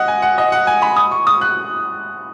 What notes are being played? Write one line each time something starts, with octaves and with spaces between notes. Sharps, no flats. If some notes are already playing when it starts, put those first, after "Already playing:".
Already playing: D#5 F#5
G#5
F#5
D#5
F#5
G#5
B5
D#6
C#6
D#6
F#6